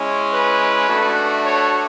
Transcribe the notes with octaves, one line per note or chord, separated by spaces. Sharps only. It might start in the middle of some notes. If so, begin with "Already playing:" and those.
Already playing: G#3 C#4 E4
B4
A3 D4 F#4
C#5